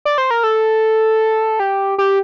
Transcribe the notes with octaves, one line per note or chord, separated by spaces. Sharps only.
D5
C5
A#4
A4
G4
G4